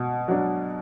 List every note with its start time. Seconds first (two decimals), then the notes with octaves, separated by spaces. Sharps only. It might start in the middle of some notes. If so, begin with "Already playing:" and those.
Already playing: B2
0.28 F#3 D4